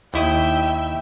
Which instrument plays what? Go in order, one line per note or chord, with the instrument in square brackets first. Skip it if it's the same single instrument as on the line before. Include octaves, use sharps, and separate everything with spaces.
[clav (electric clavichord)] D#2 E4 D#5 [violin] E5 G5